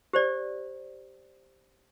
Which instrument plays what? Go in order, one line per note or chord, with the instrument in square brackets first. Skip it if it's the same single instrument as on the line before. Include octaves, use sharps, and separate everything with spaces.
[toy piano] G4 C5 D5